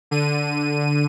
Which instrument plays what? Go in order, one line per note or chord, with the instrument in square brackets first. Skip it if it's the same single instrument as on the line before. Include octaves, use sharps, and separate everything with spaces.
[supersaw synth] D3 D#7